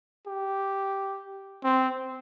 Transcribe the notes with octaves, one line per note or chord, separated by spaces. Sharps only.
G4
C4